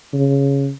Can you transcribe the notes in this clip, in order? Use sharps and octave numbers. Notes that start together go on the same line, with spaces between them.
C#3